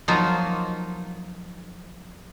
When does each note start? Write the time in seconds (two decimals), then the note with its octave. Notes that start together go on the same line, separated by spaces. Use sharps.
0.08 F3 F#3 A#3 D#4 F4